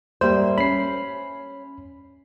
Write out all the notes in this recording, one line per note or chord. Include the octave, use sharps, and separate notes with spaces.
G#2 G3 A#3 C5 E5
C#4 B5 C7